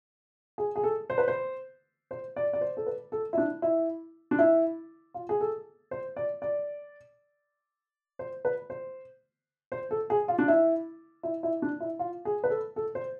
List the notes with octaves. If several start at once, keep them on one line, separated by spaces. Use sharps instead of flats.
G#4
G#4
A4
C5
B4
C5
C5
D5
D5
C5
A4
B4
A4
E4
D4
E4
D4
E4
F4
G#4
A4
C5
D5
D5
C5
B4
C5
C5
A4
G#4
F4
D4
E4
E4
E4
D4
E4
F4
G#4
B4
A4
A4
C5